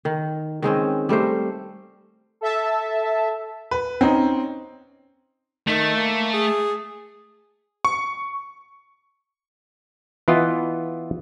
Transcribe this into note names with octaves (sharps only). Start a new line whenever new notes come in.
D#3
D#3 G#3 C4 C#4
G3 A3 A#4 C5
A4 E5 A5
B4
C4 C#4 D#4
D#3 A3
A#3
G#4
C#6
E3 B3 E4 F4 D#5 G#5